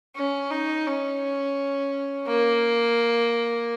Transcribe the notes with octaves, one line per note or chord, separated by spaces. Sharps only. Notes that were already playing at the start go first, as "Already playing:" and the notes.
C#4
D#4
C#4
A#3